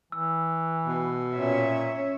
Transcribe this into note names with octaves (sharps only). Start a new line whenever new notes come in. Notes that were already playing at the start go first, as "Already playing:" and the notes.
E3 E6
B2
A#2 C#4 C#5 E5